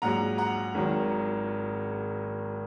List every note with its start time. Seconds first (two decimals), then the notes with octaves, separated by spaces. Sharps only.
0.02 A#1 G#2 F#3 F#5 A#5
0.38 F#5 A#5
0.75 G#1 G#2 D#3 F#3